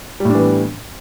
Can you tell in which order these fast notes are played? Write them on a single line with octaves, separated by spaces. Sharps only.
G3 A2 D4 E3 B3